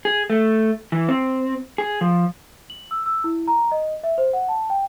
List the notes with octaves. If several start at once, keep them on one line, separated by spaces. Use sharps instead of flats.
G#4
A3
E3
C4
G#4
F3
F#7
E6
E6
E4
A#5
D#5
E5
C5
F#5
A5
G5